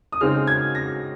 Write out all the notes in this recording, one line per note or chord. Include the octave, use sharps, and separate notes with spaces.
D#6
C#3 G#3 C4 D#4 F6
G#6
A#6